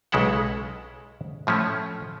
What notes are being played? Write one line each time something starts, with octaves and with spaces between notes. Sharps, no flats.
B1 C#3 G#3 E4 A4 F#5
A2 F3 A3 C#4